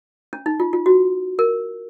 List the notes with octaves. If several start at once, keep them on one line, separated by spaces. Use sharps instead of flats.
C#4
D#4
F4
F4
F#4
A#4